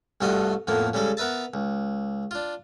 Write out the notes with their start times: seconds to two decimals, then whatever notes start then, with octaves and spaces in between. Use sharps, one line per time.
0.21 C2 G2 A3 F4 F#4 D#5
0.67 F2 A2 F3 A#3 B3
0.94 C#3 G3 G#3 A4
1.17 B3 A#4 B4 E5 A5
1.54 C#2
2.31 D4 F4